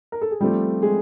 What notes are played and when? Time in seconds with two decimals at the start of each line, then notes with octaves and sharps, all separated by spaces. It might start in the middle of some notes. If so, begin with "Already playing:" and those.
0.12 A#4
0.21 A4
0.31 G#4
0.40 F3 G3 A3 C4 G4
0.82 G#3 G#4